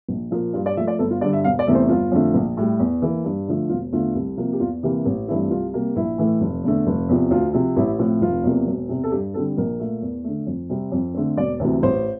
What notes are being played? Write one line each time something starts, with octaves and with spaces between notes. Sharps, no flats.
A#1
A#2 F3 A#3
G2 F4
D5
F3 A3 E5
D5
G1 A4
F4
G2 D3 D5
E5
E1 F5
D5
E2 C3 E3 A3
C5
G1 F4
F2 D3 A3
A#1
A2 G3
E2
E3 A#3
G2
D3 F3 A3
E1 F4
E2 D3 A3 F4
C2
C3 F3 A#3
G4
E2 F4
C3 E3 A#3 G4
A1
G2 E3 A3 C4 E4
C2 F4
C3 G3 A#3
A#1 E4
A2 E3 A3
F1
E2 D3 A3
F1
E2 C3 F3
D2 F4
C3 F3 C4
A1 E4
A2 F3 A3 C4
F1 F4
E2 C3 F3 A#3
E1
E2 C3
A4
G2 G4
D3 G3 C4 A4
A#1 A#4
A#2 A3
E2
D3 A3
F2
C3 G3 C4
F2
D3 A3 C4
E1 D5
D2 C3 E3
A1 C5